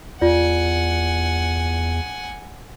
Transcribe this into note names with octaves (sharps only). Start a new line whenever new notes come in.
E2 F4 D5 F#5 G#5